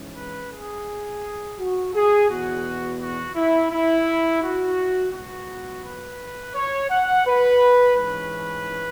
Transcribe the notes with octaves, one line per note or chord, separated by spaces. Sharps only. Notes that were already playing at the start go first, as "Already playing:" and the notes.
Already playing: G#2 E3 C#4
B4
G#4
F#4
G#4
E2 B2 B3 F#4
F#4
E4
E4
F#4
C#2 B2 F#3 B3 F#4
B4
C#5
F#5
B4
G#2 E3 C#4 B4